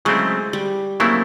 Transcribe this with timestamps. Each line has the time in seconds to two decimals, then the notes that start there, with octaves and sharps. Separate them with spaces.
0.05 C#3 F#3 G#3 A3 C4 E4
0.53 G3
1.00 C#3 F#3 A3 A#3 C4 E4